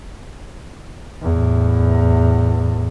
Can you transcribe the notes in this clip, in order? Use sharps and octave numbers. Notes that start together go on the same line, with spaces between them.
E2 A2